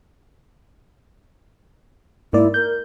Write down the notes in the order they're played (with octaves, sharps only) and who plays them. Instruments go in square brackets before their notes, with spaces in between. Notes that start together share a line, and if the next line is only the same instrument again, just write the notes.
[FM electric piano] G#2 A#3 D5 [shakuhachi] E4
[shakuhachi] A#4 [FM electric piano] G6